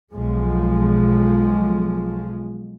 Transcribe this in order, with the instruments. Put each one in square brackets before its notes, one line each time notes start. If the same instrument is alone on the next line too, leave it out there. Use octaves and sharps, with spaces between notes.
[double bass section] B1 B2 F3 G#3